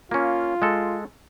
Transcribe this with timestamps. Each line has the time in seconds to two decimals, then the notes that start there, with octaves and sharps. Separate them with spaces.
0.11 A#3 C#4 F4
0.62 G#3 A4